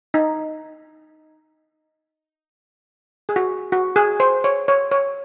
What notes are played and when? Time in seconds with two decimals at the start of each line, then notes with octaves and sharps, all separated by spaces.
0.14 D#4
3.29 G#4
3.36 F#4
3.72 F#4
3.96 G#4
4.20 C5
4.44 C#5
4.68 C#5
4.91 C#5